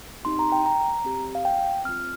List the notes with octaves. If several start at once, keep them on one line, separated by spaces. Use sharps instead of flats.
C4 D#4 G4 C6
A#5
G5
A#5
C4 G4
F5
G5
C4 F4 F6